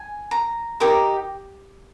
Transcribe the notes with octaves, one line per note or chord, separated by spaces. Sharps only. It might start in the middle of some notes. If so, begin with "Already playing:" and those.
Already playing: G#5
A#5
D#4 G4 A#4 D6